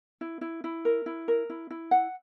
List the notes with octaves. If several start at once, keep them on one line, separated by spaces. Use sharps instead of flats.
E4
E4
E4
A#4
E4
A#4
E4
E4
F#5